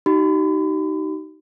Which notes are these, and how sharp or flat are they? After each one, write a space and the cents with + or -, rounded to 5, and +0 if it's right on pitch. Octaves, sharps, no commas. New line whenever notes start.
D#4 +0 G4 -40 B5 +40